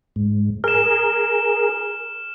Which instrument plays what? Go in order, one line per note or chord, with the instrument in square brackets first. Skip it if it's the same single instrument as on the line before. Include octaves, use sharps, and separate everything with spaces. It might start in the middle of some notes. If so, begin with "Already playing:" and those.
[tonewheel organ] G#2
[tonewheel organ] G#4 A#4 [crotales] F6 E7